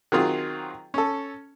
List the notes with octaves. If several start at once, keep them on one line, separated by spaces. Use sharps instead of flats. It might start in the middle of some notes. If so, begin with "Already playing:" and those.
D#3 F#3 C4 F4 G#4
C#4 A4